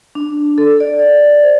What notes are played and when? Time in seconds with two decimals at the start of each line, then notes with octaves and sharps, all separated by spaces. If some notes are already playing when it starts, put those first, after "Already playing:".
0.15 D4
0.58 A4
0.80 D5
0.99 D5
1.43 C5